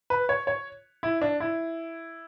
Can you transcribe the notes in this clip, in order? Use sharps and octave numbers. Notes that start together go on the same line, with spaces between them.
B4
C#5
C#5
E4
D4
E4